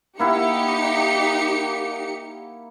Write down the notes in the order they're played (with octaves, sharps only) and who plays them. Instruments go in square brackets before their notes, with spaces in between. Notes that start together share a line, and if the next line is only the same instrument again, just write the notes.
[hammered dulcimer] A#3 E4 F#5 [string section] D#4 G4 C#7